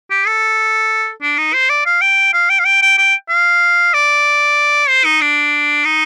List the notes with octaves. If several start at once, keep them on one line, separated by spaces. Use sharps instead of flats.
G4
A4
D4
D#4
C5
D5
F5
G5
F5
G5
F5
G5
G5
G5
F5
D5
C5
D#4
D4
D#4